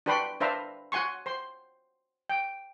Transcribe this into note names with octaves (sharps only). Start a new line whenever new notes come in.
D4 F#4 B4 G5 B5 C6
D4 B4 C5 E5 F5 A#5
F#4 F#5 G#5 C6 C#6
C5 C6
G5